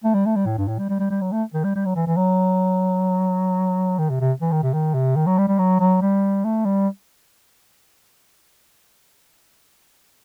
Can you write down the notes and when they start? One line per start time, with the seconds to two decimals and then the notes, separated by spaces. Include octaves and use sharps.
0.04 A3
0.14 G3
0.26 A3
0.36 G3
0.46 A2
0.58 G2
0.68 A2
0.79 G3
0.89 G3
1.00 G3
1.10 G3
1.21 F#3
1.32 A3
1.54 D#3
1.64 G3
1.75 G3
1.85 F#3
1.96 E3
2.07 E3
2.17 F#3
3.99 D#3
4.10 C3
4.21 C3
4.41 E3
4.52 D#3
4.63 C3
4.73 D#3
4.94 C3
5.16 D#3
5.26 F#3
5.38 G3
5.48 G3
5.59 F#3
5.80 F#3
6.02 G3
6.45 A3
6.65 G3